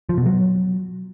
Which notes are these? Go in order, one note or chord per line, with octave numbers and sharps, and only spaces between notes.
F3
B2
F#3